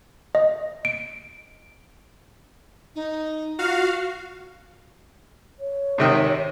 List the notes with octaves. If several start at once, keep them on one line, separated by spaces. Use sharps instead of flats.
D#5
D7
D#4
F4 F#4 F5
C#5
G#2 C3 D#3